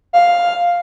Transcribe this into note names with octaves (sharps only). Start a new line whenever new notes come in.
F5